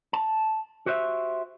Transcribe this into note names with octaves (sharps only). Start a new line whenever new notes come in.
A5
F#4 G4 C5 D#5 E5